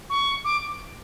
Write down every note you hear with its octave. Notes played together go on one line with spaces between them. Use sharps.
C#6
D6